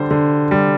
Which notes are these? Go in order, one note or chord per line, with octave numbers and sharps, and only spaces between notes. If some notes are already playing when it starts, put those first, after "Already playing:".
Already playing: D3 G3 C5
D3
G3